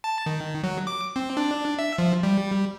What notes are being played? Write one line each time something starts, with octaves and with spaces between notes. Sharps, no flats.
A5
D#3
F#3
D6
C4
D4
E5
F3
G3